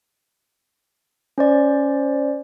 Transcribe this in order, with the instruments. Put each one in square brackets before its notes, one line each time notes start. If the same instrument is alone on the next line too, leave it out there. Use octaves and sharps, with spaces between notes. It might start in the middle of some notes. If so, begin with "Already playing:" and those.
[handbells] C#4 C5 D5